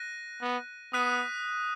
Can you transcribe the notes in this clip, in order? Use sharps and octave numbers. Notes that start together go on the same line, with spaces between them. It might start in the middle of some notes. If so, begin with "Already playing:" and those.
Already playing: F#6 A#6 D#7
B3
B3 D#6 F#6 B6 D#7